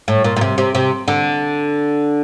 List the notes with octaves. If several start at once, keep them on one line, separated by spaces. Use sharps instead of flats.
A2
A#2
A#2
C3
C3
C3
D3